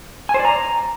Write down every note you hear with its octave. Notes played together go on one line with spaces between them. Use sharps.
G#5
C5
D5
A#5